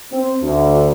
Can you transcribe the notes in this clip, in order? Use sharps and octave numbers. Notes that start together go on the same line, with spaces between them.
C4
D2